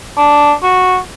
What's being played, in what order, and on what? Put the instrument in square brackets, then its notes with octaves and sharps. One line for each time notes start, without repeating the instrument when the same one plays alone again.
[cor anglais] D4
F#4